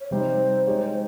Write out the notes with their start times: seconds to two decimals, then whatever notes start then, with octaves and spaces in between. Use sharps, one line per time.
0.01 C#5
0.10 C3 G3 C4 D#4 C5
0.67 G#3 D#4 G4 C#5